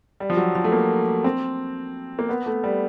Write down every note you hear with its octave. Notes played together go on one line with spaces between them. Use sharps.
G3
F3
F#3
F3
A3
A#3
C4
A#3
B3
A3
G3